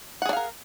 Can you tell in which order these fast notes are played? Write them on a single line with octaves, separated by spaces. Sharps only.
F#5 G#4 D4 F5 A#4